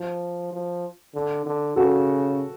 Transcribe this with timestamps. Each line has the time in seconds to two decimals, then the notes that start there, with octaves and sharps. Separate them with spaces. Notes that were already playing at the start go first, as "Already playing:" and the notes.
Already playing: F3
0.53 F3
1.14 D3
1.46 D3
1.76 C#3 F#4 A4